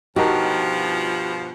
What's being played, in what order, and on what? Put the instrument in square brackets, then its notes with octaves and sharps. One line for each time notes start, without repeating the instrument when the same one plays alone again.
[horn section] G2 B2 F3 [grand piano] D#4 A5 [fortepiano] F#4 A#4 [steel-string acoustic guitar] G4